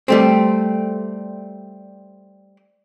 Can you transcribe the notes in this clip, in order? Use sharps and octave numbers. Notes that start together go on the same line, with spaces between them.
G3 A3 C4